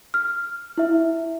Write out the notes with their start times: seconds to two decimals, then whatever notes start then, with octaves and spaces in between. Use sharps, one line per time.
0.14 F6
0.78 E4 E5